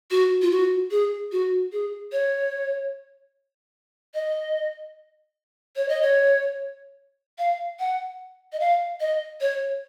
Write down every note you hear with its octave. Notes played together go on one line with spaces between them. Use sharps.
F#4
F4
F#4
G#4
F#4
G#4
C#5
D#5
C#5
D#5
C#5
F5
F#5
D#5
F5
D#5
C#5